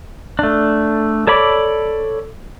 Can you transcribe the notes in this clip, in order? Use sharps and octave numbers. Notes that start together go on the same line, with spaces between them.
A3 D4
A4 C#5 D5 B5 D6